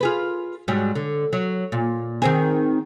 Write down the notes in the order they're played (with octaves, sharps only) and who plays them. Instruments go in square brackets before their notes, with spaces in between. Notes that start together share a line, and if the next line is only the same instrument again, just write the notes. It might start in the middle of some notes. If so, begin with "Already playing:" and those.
[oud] F4 G#4 B4
G#2 F#3 G3
D3
F#3
A#2
D#3 C4 G#4